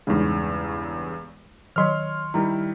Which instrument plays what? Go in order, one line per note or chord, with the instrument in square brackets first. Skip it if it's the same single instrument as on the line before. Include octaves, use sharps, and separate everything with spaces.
[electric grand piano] E2 G2 C#3 [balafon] G#3 D#4
[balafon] D#3 F#3 [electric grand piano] C#5 C6 F6
[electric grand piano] D#3 G3 E4 [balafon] A#5